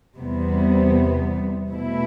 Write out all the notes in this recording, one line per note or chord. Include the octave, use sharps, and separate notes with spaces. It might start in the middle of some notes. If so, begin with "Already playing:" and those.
E2 C3 G3 B3
B2 A3 E4